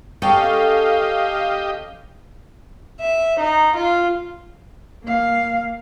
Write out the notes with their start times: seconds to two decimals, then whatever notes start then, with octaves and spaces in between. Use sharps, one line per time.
0.22 C#4 G4 A4 D#5 F5 G5
3.00 E5
3.39 D#4
3.76 F4
5.03 A#3 F5